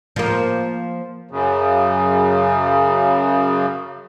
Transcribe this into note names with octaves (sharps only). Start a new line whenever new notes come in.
F3 A#3
F#2 C#3